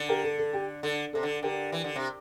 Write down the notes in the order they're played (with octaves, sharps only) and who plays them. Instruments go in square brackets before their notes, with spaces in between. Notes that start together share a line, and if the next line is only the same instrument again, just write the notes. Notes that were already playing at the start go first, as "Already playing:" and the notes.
Already playing: [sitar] D3
[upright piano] G4 A#4
A4
A4
G4
[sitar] D3 [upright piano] A4
[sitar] C3 [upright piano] A4
[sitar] D3
[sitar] D3 [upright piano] G4 A#4
[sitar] E3
D3
C3